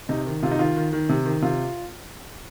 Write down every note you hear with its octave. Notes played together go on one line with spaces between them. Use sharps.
C3 D#4
D#3
C3 F4
D#4
D#3 F4
D#3
D#3
C3
D#3
C3 F4